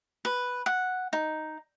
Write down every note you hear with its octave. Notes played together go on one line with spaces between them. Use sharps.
B4
F#5
D#4